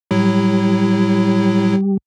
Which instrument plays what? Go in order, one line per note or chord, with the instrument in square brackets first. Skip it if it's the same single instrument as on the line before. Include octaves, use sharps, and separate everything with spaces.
[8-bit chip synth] A2 F#3 E4 [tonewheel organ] G3